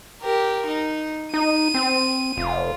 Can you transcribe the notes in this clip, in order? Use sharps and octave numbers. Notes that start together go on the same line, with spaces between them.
G4 A#4
D#4
D#4 D#7
C4
F1 F4